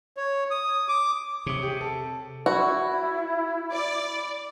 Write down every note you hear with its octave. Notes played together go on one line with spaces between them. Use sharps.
C#5
D#6
D6
C3 C#5 D#6
G4 G#4
A4 C#7
E4 F#4 B5
D5